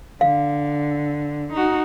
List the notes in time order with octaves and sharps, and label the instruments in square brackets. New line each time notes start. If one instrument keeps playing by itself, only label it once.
[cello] D3 [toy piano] F5
[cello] D#4 F#4